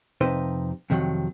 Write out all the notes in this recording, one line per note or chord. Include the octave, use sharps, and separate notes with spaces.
F2 C3 D#4 B4 C5
F2 C3 D#3 E3 F#3